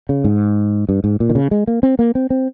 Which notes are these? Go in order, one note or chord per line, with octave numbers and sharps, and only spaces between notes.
C#3
G#2
G2
G#2
A#2
D#3
C#3
G#3
A#3
C4
A#3
C4
C4